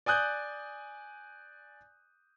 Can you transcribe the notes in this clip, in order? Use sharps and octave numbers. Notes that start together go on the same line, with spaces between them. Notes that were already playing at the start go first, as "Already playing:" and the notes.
D5 G#5 D#6 F#6 G6